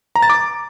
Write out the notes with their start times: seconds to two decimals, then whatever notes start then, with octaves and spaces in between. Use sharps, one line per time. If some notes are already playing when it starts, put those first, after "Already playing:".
0.16 A#5
0.23 A6
0.30 D6